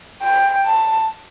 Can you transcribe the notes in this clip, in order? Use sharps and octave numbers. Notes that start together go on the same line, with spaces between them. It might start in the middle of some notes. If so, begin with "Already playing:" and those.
G5
A5